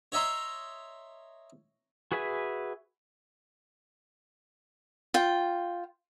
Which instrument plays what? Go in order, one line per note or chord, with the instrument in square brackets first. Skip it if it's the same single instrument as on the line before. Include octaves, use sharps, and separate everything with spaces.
[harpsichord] C#5 D#5 E5 A#5 C6
[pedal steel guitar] F#4 G#4 B4 E5 G#5
[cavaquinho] F4 G5